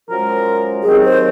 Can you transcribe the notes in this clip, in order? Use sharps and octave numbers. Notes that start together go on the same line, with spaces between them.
F#2 F3 G#3 A#4
D#2 D#3 F#3 C4 G#4
C5